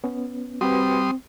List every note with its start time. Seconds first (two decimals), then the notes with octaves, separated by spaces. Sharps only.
0.04 B3 C#4
0.61 G3 C4 F#4 G4 B4 C6 D#6